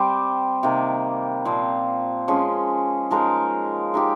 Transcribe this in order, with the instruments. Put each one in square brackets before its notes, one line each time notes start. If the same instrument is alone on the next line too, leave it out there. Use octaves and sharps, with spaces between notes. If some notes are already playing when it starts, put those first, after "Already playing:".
Already playing: [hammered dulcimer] G3 C4 G4 C5
C3 D#3 A#3
A#2 F3 C4
F3 G#3 C#4 G#4
F3 G#3 D#4 A#4
G#3 D#4 G4